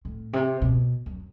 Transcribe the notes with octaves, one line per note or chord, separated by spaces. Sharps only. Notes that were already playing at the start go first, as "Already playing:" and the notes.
A2
C3
B2
F#2